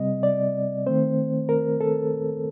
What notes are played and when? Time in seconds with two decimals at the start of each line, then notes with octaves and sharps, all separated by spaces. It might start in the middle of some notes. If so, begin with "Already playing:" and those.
Already playing: C3 G3 C4 D#5
0.23 D5
0.86 D#3 A3 C4 C5
1.49 A#4
1.81 A4